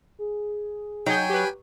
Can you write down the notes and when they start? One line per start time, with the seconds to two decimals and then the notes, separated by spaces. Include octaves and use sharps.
0.19 G#4
1.06 F#3 D#4 G5 G#5 G6
1.30 G4 B4